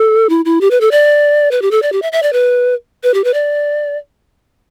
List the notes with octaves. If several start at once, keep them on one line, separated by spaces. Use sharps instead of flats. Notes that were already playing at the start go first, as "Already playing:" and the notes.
Already playing: A4
E4
E4
G4
B4
A4
D5
B4
G4
A4
D5
G4
E5
E5
D5
B4
B4
G4
B4
D5